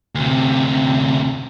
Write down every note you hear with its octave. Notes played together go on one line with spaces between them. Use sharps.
D2 C3